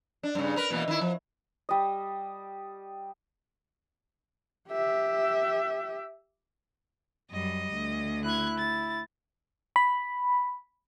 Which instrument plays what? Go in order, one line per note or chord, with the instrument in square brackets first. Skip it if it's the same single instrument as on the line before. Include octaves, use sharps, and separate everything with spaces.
[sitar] D4
G2 C#3
A#4 B4
B2 E3 A#3
D#3 E4
F3
[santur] G3 D#5
[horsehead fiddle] G4 E5
[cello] F#2 G3 [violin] D#5
[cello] D2
[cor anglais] E4 [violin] F#6 G#6
[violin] A6
[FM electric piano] B5